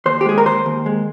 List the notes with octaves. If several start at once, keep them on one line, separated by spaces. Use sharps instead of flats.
D#2 C5
G4
G#3 G#4
A#4
D#2 C5
D#2
G#3